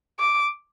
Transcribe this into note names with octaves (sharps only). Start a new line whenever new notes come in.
D6